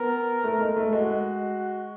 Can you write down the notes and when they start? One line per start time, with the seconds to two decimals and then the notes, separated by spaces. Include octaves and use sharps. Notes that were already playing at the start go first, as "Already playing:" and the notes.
Already playing: B3 A#4
0.44 A3
0.60 G#3
0.76 A3
0.93 G#3 F#4